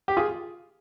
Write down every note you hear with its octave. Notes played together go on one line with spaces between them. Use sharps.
G4
F4 G#4